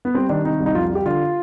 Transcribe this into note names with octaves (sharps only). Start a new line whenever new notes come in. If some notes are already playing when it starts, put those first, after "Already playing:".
B3
G3 C4
D#3 D4
C3 D#4
C2
D#4
F2 F4
G3 G4
D3 F4